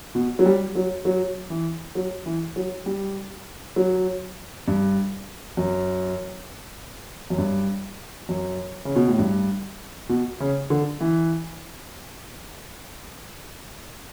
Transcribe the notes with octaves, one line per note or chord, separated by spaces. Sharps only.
B2
F#3
G3
F#3
F#3
E3
F#3
E3
F#3
G3
F#3
G2
F#2
F#2
G2
F#2
C#3
B2
A2
G2
B2
C#3
D3
E3